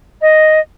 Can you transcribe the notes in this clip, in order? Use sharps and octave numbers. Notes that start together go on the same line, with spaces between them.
D#5